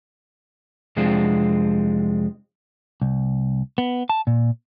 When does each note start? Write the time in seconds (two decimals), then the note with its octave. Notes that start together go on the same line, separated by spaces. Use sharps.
0.97 F2 C3 G#3 C4 D4 F4
3.02 C2
3.78 B3
4.09 A5
4.27 A#2